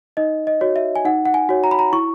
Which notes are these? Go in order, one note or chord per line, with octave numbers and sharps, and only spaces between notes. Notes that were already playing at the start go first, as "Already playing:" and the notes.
D#4 D#5
D#5
F#4 C#5
E5
G#5
D#4 F#5
F#5
G#5
F#4 C#5
A#5
B5
A#5
E4 C#6